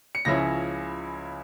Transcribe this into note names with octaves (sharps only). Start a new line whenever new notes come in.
C#7
C#2 C#3 F3 C#4 E4 A#6